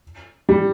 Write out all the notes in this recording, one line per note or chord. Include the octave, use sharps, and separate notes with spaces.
G3